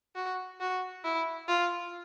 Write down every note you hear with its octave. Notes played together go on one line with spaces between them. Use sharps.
F#4
F#4
E4
F4